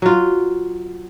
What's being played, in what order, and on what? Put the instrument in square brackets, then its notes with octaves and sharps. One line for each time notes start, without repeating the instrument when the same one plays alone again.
[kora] F#3 F4